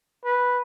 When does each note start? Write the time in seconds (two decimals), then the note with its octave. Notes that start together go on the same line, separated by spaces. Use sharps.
0.25 B4